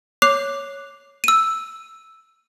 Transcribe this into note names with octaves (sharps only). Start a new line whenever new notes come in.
C#5 D6 F#6 C7 F7
E6 D#7